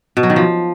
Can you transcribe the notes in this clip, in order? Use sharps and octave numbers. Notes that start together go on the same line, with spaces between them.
B2
F#3
D#3
F3